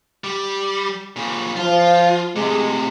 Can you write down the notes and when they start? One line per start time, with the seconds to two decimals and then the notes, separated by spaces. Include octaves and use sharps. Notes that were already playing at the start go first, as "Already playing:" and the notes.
0.24 G3
1.16 A#2 C#3
1.56 F3 F4
2.36 A2 C3 G#3